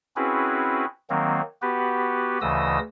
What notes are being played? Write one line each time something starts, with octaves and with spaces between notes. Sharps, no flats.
C4 C#4 E4 F#4 G#4 B4
D#3 F#3 A#3 C4
B3 F#4 G4 B4
D2 C#3 E3 D#5 D#6 E6